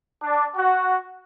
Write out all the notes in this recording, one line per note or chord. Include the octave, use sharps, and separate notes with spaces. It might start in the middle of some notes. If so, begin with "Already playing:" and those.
D4
F#4